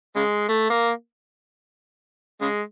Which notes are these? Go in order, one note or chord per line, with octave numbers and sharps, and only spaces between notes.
C#3 G#3
A3
A#3
C#3 G#3